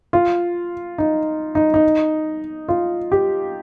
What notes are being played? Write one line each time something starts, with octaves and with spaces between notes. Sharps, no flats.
F4
D#4
D#4
D#4
F4
G4